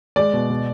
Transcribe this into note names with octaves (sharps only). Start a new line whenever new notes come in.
G#3 D5
B2
B2